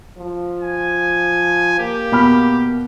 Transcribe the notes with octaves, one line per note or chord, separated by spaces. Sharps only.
F3
G#5
A#3 G4
B2 B5 F6